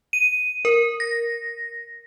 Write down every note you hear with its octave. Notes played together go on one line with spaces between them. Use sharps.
D#7
A#4
A#6